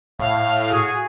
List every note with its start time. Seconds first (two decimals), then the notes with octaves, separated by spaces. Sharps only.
0.19 A2 F5
0.70 F#4 G#4